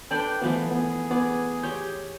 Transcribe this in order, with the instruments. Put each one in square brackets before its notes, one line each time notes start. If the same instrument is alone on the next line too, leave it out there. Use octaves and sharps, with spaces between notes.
[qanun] D4 D5 [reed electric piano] A4 B4 [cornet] G5
[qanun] E3 G#3 A3 [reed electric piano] F3 B3 [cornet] G#4
[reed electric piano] B3
[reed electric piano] B3 [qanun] D5
[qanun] G4 C#5 [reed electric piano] G6